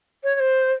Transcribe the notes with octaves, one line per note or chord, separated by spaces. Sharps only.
C#5
C#5
C5